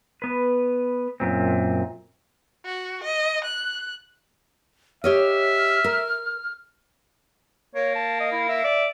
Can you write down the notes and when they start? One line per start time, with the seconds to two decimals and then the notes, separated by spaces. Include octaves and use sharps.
0.22 B3 B4
1.20 F#2 A#2 C4
2.65 F#4
3.04 D#5
3.44 F#6
5.04 G4 C#5 D#5 E5 F6
5.84 A#4
7.75 A#3 C#5
7.95 A5
8.20 D#5
8.32 E4
8.49 E5
8.64 D5